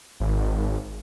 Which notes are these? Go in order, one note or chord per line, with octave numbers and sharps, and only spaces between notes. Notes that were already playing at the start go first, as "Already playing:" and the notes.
G#1